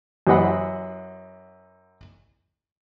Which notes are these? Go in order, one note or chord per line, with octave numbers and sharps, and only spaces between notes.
F#2 E3 C5 D#5 F#5 B5